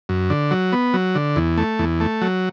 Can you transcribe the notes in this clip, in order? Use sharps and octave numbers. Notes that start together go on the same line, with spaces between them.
F#2
D3
F#3
B3
F#3
D3
E2
A3
E2
A3
F#3